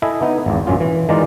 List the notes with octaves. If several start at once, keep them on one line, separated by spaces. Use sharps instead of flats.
E4 A4 D#5 E5 G#5
B3 D#4
G#1 E2
A#1 F#2 C#4 F4
E3
D#3 E3 G#3 F4 A#4 D5